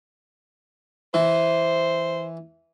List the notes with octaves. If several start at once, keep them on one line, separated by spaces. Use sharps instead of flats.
E3 C5